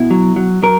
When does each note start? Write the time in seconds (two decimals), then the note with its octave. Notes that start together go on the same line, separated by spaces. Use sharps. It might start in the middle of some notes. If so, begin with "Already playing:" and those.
Already playing: B2 E4
0.11 F#3
0.36 F#3
0.63 F#3 A#4